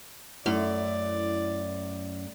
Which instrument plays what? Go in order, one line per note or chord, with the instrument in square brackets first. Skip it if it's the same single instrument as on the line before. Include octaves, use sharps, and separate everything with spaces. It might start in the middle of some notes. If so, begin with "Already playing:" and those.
[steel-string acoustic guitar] F#2 [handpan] A3 [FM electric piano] E4 [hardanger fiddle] D5